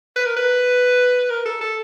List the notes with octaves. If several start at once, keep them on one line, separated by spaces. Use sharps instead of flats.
B4
A#4
B4
A#4
A4
A4